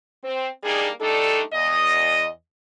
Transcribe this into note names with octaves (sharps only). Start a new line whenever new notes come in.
C4
G3 A#3 D4 D#4 G#4
G3 A3 D4 D#4 A4
E2 D#5